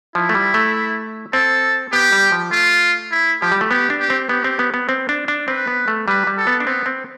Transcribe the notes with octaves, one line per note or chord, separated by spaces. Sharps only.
F3 E4
A3
G3
A3
C4 A4
B3 G4
G3
F3
A3 F4
E4
F3 G4
G3
A3
B3 G4
D4
G4
C4
B3 G4
C4
B3
B3
C4
D4
D4
C4 B4
B3
A3
G3 B4
G3
A4
B3
D4
B3 C4
C4